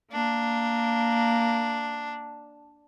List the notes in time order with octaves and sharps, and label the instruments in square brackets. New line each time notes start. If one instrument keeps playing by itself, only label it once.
[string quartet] A#3 [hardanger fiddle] D4